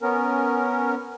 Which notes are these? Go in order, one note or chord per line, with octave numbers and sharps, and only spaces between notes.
B3 C#4 A#4